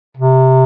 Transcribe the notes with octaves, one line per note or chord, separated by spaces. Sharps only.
C3